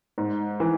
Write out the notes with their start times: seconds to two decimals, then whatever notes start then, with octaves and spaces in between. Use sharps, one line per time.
0.18 G#2
0.60 E3